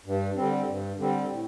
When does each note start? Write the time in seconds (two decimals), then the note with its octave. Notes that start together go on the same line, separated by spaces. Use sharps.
0.06 G2
0.36 D3 G3 C4
0.68 G2
0.99 D3 G3 C4
1.30 A2